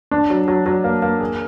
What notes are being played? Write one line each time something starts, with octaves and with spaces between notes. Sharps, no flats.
D4
F#3
F#3
F#3
A#3
A#3
G#4